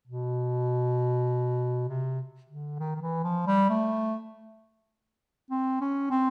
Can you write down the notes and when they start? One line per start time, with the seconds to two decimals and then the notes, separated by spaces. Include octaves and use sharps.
0.07 B2
1.88 C3
2.49 D3
2.79 D#3
2.95 D#3
3.02 E3
3.24 F3
3.47 G3
3.69 A3
5.50 C4
5.81 C#4
6.11 C4